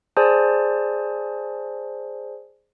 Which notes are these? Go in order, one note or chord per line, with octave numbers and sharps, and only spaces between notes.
G#4 C5 D5 G#5 A5